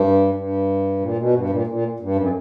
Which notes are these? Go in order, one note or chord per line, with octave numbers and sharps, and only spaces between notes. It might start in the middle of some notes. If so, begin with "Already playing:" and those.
Already playing: G2
G2
A#2
B2
G2
A#2
A#2
G2
F#2